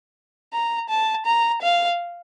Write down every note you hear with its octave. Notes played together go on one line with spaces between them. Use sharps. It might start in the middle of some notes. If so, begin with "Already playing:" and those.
A#5
A5
A#5
F5